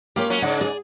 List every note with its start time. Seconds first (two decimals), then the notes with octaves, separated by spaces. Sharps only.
0.16 A#3 C#4 F4 G4
0.30 F#3 C#4
0.42 G#2 C#3 F#5
0.61 G#4 D5